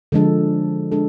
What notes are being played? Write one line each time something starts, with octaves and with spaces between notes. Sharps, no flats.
D3 F3 G#3 D4 A4
G#3 D4 A4